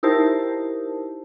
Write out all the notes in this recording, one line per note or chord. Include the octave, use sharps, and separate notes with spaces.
D#4 E4 G4 A#4 C5 A5